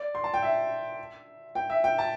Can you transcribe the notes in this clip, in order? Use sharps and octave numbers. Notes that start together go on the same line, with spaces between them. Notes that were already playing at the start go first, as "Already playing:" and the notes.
Already playing: D5
C6
A5
G5
E5
G5
E5
G5
A5